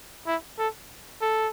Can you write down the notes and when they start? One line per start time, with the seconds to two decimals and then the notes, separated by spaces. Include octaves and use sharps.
0.27 E4
0.58 A4
1.21 A4